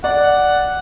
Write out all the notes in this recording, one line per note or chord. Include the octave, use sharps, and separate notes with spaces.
D5 F#5